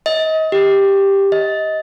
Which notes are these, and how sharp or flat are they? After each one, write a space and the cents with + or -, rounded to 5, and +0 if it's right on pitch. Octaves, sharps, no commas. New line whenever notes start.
D#5 +30
G4 +5
D#5 +20